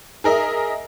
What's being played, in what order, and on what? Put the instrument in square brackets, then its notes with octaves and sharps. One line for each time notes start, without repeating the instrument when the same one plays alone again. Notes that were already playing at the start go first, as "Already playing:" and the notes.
[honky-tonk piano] G#4 A#4 D#5 E5